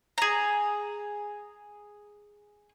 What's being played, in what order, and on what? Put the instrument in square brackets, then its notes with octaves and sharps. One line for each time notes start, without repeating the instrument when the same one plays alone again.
[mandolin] G#4 A#5